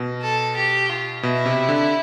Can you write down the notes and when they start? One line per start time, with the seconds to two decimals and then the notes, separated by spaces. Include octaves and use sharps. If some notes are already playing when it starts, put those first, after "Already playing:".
Already playing: B2
0.22 A4
0.56 G4
0.89 F4
1.23 B2 E4
1.46 C3
1.69 D3